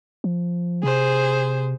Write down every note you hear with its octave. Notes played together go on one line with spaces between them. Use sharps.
F3
C3 G#4 C5